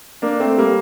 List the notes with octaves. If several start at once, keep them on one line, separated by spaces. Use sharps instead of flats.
A#3 D4
A3 C4
G3 A#3